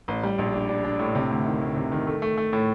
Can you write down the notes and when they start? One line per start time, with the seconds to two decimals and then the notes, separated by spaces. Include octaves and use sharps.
0.08 A1
0.23 G3
0.38 A#1
0.54 D4
0.69 D4
0.85 D4
0.99 A2
1.15 C3
1.31 D2
1.45 D#3
1.61 D2
1.77 C3
1.92 D#3
2.07 A3
2.22 A3
2.37 A3
2.53 A2